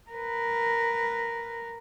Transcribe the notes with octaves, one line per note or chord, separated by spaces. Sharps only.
A#4 B4